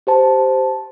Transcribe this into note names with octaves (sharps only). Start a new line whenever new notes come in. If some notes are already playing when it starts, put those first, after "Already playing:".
G4 C5 A5